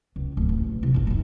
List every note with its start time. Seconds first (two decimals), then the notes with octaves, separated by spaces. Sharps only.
0.16 C#2
0.37 D1
0.49 A1
0.83 C2
0.94 E1 A#1
1.07 D3 D#3